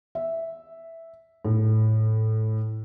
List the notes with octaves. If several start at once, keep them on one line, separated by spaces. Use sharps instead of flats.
E5
A2